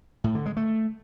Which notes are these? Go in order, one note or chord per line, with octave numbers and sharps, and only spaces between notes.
A2
D3
G#3
A3